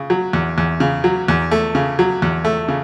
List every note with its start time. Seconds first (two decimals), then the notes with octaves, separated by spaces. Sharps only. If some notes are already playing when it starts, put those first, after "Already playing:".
Already playing: C#3
0.10 F#3
0.33 E2
0.58 E2
0.80 C#3
1.04 F#3
1.28 E2
1.51 A3
1.75 C#3
1.99 F#3
2.22 E2
2.45 A3
2.68 C#3